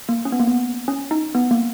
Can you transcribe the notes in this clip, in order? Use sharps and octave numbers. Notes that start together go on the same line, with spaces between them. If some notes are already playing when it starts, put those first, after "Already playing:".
A#3
C#4
B3
A#3
B3
C#4
D#4
B3
A#3